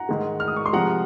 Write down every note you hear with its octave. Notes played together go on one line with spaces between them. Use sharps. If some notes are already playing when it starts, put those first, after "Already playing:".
Already playing: F#5 A#5
G#2 D#3 G#3
F6
D#6
C#6
C6
C3 F3 G#3 F#5 A#5